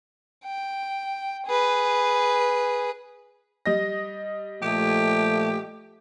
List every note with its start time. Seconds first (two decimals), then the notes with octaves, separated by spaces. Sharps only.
0.45 G5
1.47 G#4 B4
3.66 G3 D#5 A#6
4.62 A#2 F3 A3 G4